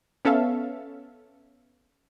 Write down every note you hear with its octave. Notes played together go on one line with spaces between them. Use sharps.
B3 C#4 A4 E5 F5